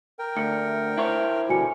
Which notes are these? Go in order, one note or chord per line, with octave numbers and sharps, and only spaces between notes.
A#4 G5
D2 C#7
E4 C5 C#5
B2 D3 G3 F#4 G#5 C#7